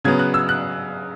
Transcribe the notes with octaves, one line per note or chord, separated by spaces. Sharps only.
C#3 F#3 B3 G#6
F#6
E6
F#6